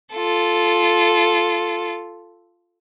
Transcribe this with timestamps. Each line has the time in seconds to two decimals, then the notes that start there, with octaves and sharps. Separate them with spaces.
0.13 F4 A4